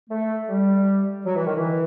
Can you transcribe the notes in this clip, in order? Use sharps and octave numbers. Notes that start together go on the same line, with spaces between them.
A3
G3
F#3
E3
D#3
E3